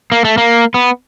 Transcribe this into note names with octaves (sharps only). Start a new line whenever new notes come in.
A#3
A3
A#3
B3